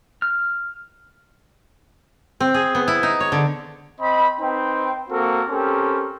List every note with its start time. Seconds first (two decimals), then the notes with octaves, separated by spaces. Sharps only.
0.22 F6
2.40 C4
2.54 G#4
2.75 B3
2.88 E4
3.03 D#4
3.20 C#5
3.32 D3
4.00 C4 D#5 B5
4.39 C4 D#4 B4 G5
5.10 A#3 C4 F#4 A4 A#4
5.50 C4 C#4 G4 A4 A#4